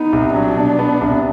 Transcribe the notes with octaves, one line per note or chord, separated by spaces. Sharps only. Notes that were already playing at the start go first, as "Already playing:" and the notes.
Already playing: B3 D#4
C2
F#3 D4
B2
B3
C2